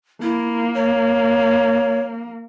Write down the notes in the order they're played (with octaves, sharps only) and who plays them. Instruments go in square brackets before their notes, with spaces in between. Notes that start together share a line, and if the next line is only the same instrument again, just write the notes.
[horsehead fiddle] A#3 [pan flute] E4
[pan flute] C#5